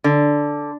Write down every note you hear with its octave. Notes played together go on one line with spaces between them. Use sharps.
D3